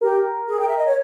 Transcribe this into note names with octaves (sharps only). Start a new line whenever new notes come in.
G4 A#4
G#4
G5
E5
D#5
C#5